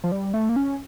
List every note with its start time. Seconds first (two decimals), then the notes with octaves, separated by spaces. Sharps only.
0.04 F3
0.12 G3
0.34 A3
0.49 A#3
0.56 C#4